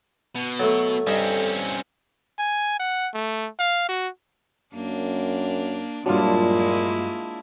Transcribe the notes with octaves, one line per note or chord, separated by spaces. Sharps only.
B2
F#3 A3 A4
G2 C4 C#4 D#4
G#5
F#5
A3
F5
F#4
F#2 A#3 D4
G2 A#2 F#3 G#3 A#3 D4 E4 F4